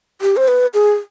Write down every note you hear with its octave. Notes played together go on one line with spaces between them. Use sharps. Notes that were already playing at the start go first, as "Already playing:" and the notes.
G4
C5
B4
G#4